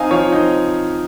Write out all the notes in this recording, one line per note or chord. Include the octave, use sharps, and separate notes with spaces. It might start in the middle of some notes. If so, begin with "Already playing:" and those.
Already playing: C4 D#4 F5 G#5
F3 C#5 F5
C4 D#4